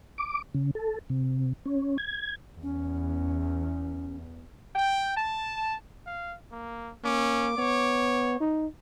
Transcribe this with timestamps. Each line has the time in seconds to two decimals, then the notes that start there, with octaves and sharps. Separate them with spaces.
0.18 D6
0.54 C#3
0.75 A4
1.10 C3
1.66 C#4
1.98 G#6
2.63 E2 C#4
4.75 G5
5.17 A5
6.06 F5
6.52 A#3
7.04 A#3 C#4 D6
7.58 B3 C#5
8.40 D#4